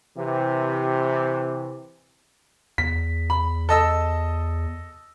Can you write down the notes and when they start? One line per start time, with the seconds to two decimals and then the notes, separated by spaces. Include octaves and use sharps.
0.16 C3 E3
2.78 E2 B6
3.30 B5
3.69 A4 D#5 E6